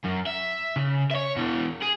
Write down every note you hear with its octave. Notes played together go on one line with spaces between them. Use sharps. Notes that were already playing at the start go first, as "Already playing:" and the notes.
F#2
E5
C#3
C#5 E5
B2 E3
G#4